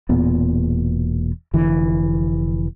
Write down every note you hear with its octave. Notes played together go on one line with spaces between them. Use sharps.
E1 E2 A#2 B3
F1 D3 E3